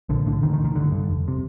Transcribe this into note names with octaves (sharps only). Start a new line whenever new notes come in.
A#1 D3
A2 D3
D2 D#3
D#3
D3
D#3
G1 D3
G2 D3
F1
C3